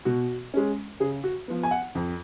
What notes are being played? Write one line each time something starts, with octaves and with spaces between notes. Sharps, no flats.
B2 F#4
G#3 C#4
C#3 G#4
F#4
F3 B3
G#5
F#5
F2